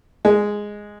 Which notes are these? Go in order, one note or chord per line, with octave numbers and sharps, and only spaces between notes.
G#3